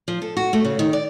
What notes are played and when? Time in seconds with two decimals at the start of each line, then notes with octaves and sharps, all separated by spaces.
0.08 F3
0.22 A4
0.37 F#4
0.53 A3
0.65 C#3
0.79 D#3
0.93 D5